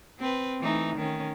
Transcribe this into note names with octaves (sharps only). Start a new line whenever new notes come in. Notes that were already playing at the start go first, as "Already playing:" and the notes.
C4 B4
E3 A3 D#4
D#3 C#4